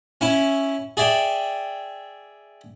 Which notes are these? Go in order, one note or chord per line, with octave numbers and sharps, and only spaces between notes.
C#4 E4
G#4 D5 E5 G5